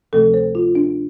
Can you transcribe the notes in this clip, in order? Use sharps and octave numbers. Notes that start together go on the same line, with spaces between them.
D2 C3 F3 A3 A4
C5
F4
D4